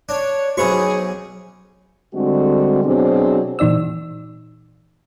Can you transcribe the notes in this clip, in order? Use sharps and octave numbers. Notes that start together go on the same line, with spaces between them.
D4 C#5
B1 C#4 F#4 G#4 C5 B5 C#6
D3 G3 G#3 C4 F#4
B2 F#3 C4 D4 G#4
A#2 E3 D#4 D5 E6